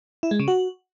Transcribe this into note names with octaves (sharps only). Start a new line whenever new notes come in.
E4
G#3
C#3
F#4